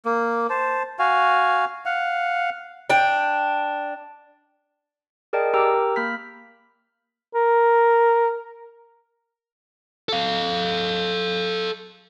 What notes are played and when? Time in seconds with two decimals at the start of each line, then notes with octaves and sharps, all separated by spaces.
0.05 A#3
0.50 C5 A5
0.99 F#4 F5 G#5
1.86 F5 F#5
2.90 D4 G5
5.33 G#4 A#4 D5 D#5 G5 A5
5.54 G4 A#4 G5 A#5 D6 E6
5.96 A#3 B5 F6 G6 B6
7.35 A#4
10.09 A4 F5